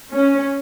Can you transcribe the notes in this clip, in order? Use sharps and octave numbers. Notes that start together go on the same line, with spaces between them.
C#4